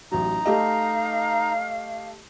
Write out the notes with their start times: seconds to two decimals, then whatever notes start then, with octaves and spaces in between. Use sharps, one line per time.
0.12 A1 F#3 D#4 A#5
0.46 A3 G4 D#5 F5